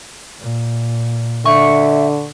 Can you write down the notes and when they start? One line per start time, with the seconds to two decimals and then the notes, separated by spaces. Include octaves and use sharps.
0.40 A#2
1.46 D3 E5 C#6